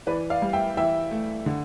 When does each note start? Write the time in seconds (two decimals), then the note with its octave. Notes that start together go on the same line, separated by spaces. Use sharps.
0.07 E3 B4 D5
0.30 D5 F5
0.42 G3
0.53 E5 G5
0.77 E3 E5 G5
1.11 A3
1.46 D3